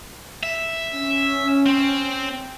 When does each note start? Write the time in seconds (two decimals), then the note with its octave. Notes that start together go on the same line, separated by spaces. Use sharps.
0.43 E5
0.93 C#4
1.66 C4